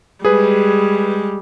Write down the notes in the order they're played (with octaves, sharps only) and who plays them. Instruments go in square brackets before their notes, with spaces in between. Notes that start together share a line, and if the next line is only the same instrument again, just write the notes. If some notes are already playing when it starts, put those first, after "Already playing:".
[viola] G3 G#3 [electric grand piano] G#4 B4